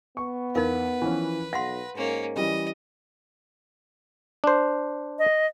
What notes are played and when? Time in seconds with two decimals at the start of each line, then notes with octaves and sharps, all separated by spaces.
0.17 B3 C#6
0.55 E2 D#4 A#4 B4 F5
1.02 E3 F3 C#4
1.53 B1 F5 F#5 C6 A#6
1.96 G#2 A#3 C#4
2.36 E3 G3 C#4 D#5
4.44 D4 C5
5.19 D#5